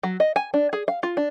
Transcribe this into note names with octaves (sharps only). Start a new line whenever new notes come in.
F#3
D#5
G#5
D4
G#4
F5
F4
D4